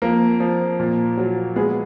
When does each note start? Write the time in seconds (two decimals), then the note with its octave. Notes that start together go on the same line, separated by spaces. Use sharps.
0.02 F2 A#3 A#4
0.40 F3
0.80 A#2
1.17 F#3
1.56 G#3 B3 G#4